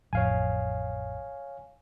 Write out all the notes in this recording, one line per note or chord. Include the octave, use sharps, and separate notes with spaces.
A1 F2 C#5 F5 G#5